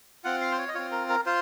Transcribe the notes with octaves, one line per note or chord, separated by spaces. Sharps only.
C4 F4 F#5
F5
C5
C#5
D#5
C4 F4 C#5
A#4
A#4
F4 C5